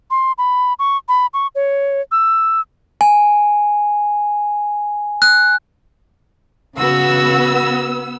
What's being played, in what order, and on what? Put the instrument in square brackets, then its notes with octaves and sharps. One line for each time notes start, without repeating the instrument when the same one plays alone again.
[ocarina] C6
B5
C#6
B5
C#6
C#5
E6
[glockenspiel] G#5
F#6
[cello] C#3 F#4 [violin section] B3 E6